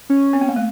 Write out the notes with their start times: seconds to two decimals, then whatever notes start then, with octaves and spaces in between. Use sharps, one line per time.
0.10 C#4
0.33 C4
0.41 B3
0.49 A#3
0.56 A3